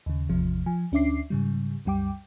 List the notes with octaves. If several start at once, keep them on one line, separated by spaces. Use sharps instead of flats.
D#2 C#3
G#1 E2 C3 F3
F3 G#5
D2 C#4 D4 E5 D6 C7
G#2 C#3 G3
C2 F#2 G3 G5 D6